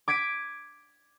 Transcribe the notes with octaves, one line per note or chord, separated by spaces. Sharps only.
D6 G#6 B6 D7 D#7